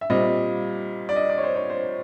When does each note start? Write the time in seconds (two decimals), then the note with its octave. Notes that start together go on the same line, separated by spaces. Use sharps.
0.01 E5
0.10 A#2 G3 C4 D#5
1.09 D5
1.16 D#5
1.30 D5
1.38 C#5
1.43 C5
1.56 C#5
1.70 C5